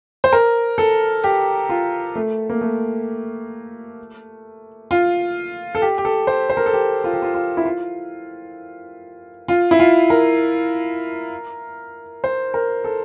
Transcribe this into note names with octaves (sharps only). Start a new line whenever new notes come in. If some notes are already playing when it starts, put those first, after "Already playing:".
C5
A#4
A4
G4
F4
A3
A#3
A3
F4
A4
G4
G4
A4
C5
C5
A#4
A4
G4
F4
G4
F4
F4
E4
F4
F4
E4
F4
A#4
C5
A#4
A4